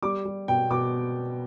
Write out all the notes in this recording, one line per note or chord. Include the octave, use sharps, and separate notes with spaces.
G3 D6
G3
B2 G5
B2 D6